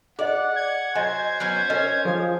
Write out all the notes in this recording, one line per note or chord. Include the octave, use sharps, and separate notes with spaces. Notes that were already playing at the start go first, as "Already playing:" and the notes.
G#4 D5 D#5 F#5
G#6
F#3 C5 D#5 G#5
F#3 B3 C#4
C#4 A#4 C#5 D#5
F3 G#4 D#6